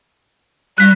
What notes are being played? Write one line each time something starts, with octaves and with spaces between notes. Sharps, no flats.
G3 F#6 B6